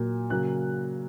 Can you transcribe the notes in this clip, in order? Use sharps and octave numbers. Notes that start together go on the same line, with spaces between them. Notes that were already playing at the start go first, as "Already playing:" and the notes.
Already playing: A#2 F#3 A#3
C#3 F#3 A#3 F#6